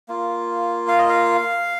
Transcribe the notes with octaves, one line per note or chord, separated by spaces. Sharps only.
A#3 F4
F5
D#5
F5